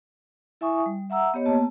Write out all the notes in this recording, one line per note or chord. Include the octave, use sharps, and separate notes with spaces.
E4 E5 G#5 C#6 D#6
G3
E5 F#5 A#5 E6
B3 G4 C#5 D#5
A#3 B3 A5